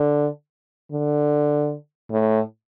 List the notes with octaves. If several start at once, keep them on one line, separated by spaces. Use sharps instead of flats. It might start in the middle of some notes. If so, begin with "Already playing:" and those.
Already playing: D3
D3
A2